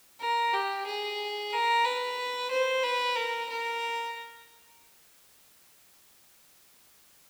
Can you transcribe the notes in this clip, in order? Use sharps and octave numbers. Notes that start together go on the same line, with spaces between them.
A#4
G4
G#4
A#4
B4
C5
B4
A#4
A#4